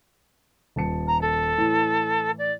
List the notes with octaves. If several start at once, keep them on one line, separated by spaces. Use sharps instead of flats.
D#1 A5 C#7
A#5
A4
A2 E3
D5